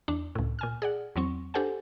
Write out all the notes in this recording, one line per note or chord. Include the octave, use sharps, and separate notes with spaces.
E2 D4
C#2 A2
A#2 G#5 F6
G#4 D5 F#5
E2 F#3 C4 C#6
D4 G4 A4 C5 F#5 G#5